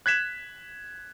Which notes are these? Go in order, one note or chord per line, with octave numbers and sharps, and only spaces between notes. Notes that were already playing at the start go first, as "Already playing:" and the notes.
F#6 G#6 B6 E7